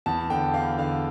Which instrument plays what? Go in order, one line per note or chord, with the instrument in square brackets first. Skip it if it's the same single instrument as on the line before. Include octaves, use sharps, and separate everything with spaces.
[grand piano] E2 A5
D3 G5
E2 F5
D3 F5